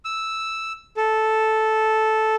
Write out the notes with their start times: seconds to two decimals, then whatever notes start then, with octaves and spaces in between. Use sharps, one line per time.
0.05 E6
0.97 A4